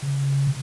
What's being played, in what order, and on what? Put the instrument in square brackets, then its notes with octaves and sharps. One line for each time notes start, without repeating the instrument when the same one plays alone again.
[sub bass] C#3
C3